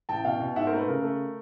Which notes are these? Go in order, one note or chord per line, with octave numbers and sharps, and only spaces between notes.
A1 G5 A5
B2 F5 G5
B2
G#2 E5 F#5
A#4 C5
A3
B4
C#3 A#4
A3